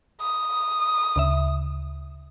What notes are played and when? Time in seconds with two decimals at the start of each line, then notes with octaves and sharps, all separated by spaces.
0.21 D#6
1.16 D2 C#3 E5